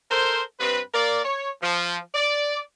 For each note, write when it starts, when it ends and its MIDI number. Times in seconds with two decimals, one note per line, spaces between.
0.11 0.42 69
0.11 0.42 70
0.11 0.42 72
0.60 0.81 43
0.60 0.81 60
0.60 0.81 71
0.94 1.21 58
0.94 1.21 70
0.94 1.21 74
1.25 1.50 73
1.62 1.98 53
2.14 2.60 74